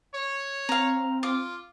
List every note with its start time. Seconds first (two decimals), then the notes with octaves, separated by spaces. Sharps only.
0.14 C#5
0.69 C4 F5 A#5
1.23 F4 D6